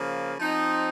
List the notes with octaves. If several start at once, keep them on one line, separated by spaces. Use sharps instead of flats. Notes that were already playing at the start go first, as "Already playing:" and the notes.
Already playing: C#3 F3 A#3
F3 C4 D#4